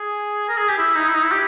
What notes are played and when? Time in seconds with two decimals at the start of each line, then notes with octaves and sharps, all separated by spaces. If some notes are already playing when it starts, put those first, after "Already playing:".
Already playing: G#4
0.49 A#4
0.58 G#4
0.69 G4
0.78 E4
0.95 D#4
1.08 E4
1.14 D#4
1.23 E4
1.32 G4